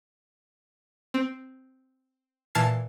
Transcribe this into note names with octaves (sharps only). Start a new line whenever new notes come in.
C4
A#2 E3 A5 F6 G#6 C7